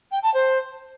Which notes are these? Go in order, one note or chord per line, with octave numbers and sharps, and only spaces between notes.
G5
A5
C5